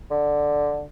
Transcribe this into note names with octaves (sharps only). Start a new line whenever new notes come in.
D3